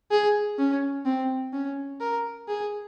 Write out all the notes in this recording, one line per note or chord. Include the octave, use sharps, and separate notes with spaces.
G#4
C#4
C4
C#4
A#4
G#4